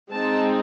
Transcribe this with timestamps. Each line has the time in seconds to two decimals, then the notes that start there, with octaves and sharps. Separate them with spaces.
0.11 G#3 C4 D#4 A5